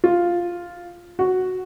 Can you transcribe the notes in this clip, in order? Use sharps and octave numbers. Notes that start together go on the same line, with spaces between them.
F4
F#4